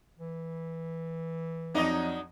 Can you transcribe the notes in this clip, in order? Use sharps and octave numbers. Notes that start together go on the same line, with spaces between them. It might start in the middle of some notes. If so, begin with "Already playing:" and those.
E3
F2 F#3 D#4 D5 D#5